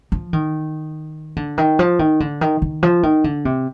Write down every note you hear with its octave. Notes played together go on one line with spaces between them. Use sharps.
F3
D#3
D3
D#3
F3
D#3
D3
D#3
D#3
F3
D#3
D3
C3